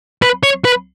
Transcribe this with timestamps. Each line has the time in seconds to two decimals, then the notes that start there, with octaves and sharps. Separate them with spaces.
0.22 B4
0.43 C#5
0.65 B4